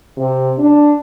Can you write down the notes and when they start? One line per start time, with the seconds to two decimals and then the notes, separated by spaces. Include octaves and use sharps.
0.17 C3
0.59 D4